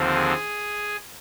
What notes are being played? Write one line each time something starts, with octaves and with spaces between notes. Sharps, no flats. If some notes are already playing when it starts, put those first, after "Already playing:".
Already playing: D#2 D3 F3 C4
G#4